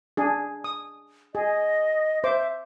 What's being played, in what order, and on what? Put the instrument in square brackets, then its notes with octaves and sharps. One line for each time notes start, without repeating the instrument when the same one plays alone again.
[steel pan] D4 G#4
D#6
[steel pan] G#4 [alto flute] D#5
[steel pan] C5 D6 [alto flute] E5